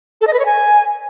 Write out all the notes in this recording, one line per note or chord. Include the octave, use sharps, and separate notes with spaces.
A4
D#5
B4
C#5
G#5